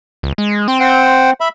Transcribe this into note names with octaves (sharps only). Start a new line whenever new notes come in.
C#2
G#3
C4 G5 C6
C5 F#5 G5
E5 B5